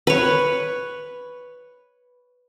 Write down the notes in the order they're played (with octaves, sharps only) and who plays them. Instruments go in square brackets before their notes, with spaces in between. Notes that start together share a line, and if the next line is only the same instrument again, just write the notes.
[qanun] B4 C#5